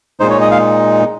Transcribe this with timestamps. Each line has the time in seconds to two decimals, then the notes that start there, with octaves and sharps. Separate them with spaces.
0.20 A#2 G#3 D#4 C5
0.30 C#5
0.41 D#5
0.51 F5